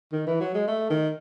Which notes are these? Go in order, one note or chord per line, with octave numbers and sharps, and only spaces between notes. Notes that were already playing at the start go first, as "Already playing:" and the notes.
D#3
E3
F#3
G#3
A3
D#3